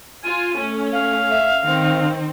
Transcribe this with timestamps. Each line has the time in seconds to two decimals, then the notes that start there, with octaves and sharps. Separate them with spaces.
0.24 F4 G#5 D#7
0.57 A3 C#4
0.92 F5
1.31 E5
1.66 D#3 C4